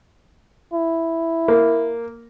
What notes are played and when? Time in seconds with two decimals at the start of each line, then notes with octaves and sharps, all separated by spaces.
0.73 E4
1.48 A#3